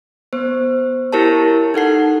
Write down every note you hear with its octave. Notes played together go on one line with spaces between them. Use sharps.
B3 C5
E4 G4 A#4 C#5 A5
D#4 A4 F#5 C7